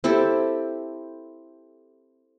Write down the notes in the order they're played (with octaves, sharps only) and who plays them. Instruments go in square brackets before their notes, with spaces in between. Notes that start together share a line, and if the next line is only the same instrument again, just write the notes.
[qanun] C4 E4 G4 A4